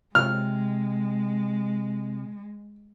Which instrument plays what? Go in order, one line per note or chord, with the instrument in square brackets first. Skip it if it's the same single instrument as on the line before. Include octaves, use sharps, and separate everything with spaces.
[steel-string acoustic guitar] C3 [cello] G#3 [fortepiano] F6